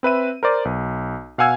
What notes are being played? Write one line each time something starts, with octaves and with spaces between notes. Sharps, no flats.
C4 B4 E5 D#7
A#4 C5 D5
B1
B2 F5 F#5 G#5 E6 G#6